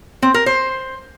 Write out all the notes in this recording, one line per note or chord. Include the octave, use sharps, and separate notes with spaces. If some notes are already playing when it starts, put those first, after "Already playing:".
C4
A#4
C5